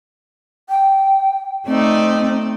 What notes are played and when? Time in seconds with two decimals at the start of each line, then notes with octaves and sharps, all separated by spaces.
0.69 G5
1.67 A3 C4 D#4 D5